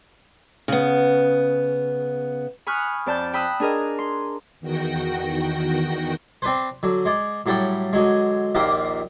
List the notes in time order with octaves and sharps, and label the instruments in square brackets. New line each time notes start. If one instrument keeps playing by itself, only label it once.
[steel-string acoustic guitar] C#3 B3
[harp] G#5 B5 C#6 D#6 F6 F#6
F2 D5 A5 G6
G5 B5 D#6 E6 F#6
D4 G#4 A#4 D#5
C6
[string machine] E2 D#3 F#4 G5 A#6
[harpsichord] C4 D4 B4 C5
D3 F#3
G#3 D5
A2 F#3 G3 A4 G5 B5
D3 F#3 G#3
A#1 D#2 A#2 A#3 G4 F5